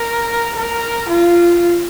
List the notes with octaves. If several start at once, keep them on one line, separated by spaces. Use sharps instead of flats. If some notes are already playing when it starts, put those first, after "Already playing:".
Already playing: A#4
A#4
F4